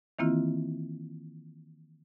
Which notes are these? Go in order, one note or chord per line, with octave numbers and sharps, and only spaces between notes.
D#3 E3 A#3 C4 E4 F4